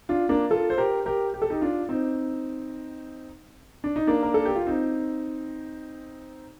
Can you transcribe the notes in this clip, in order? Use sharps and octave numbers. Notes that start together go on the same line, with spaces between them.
D4 F4
A#3 D4
F4 A4
C5
G4 A#4
G4 A#4
G4
A4
D#4 G4
D4 F4
C4 D#4
D4
D#4
A#3 D4
A#4
A4
G4
F4
C4 D#4